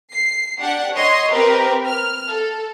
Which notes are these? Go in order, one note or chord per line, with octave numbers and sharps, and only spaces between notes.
C7
D4 G4 F#5
C#5 D#5 C6
C4 G4 A#4 B4
F6
A4